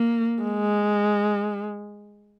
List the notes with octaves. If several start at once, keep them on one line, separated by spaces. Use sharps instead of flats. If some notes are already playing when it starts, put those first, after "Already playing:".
Already playing: A#3
G#3